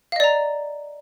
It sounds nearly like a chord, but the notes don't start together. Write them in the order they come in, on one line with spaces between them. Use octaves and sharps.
F5 D#5 D5 A#5